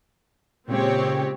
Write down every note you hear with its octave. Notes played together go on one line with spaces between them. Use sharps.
A#2 C#3 G#3 C4 G4 C#5